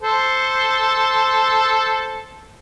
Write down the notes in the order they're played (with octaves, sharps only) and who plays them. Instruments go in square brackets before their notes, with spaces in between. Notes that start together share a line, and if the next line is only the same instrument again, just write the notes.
[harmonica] A4 C5